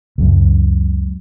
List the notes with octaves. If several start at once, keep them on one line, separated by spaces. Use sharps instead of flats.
C#2 F#2